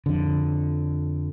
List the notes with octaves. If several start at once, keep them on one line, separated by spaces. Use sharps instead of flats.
F2 D3